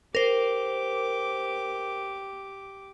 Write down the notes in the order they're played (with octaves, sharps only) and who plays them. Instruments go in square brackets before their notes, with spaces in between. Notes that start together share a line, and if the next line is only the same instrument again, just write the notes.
[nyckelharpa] G4 D6 [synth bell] A#4 C5